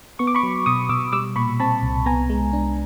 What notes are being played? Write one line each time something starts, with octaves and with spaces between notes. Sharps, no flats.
B3 C#6
D6
B5 C#6
F#3
B2 C#6 D#6
B2 D6 E6
G3 D6 E6
A#2 B5 C#6
C4 A5 B5
C2
B3 G#5 A#5
G#3
D4